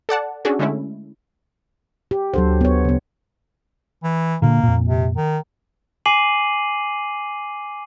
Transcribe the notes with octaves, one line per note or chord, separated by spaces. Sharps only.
A4 D5 F#5 A5
C#4 D4 F#4 G#4 A4
D3 G#3 A3 C#4 E4
G4
D2 F#3 A4 C5
B3 C#5
C#3 B3
E3
A#2 D3 A#3
F2 A#2
C3
D#3
G#5 D6 C7 D#7 F#7